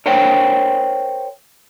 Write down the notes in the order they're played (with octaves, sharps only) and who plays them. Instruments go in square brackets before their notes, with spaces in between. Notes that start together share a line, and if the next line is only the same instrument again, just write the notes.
[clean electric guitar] A#4 C5 C#5 F#5 G5